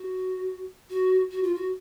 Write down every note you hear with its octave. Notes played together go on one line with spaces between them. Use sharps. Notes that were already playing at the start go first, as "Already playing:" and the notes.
Already playing: F#4
F#4
F#4
F4
F#4